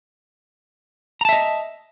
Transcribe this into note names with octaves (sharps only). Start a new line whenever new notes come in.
D#5 E5 A5 A#5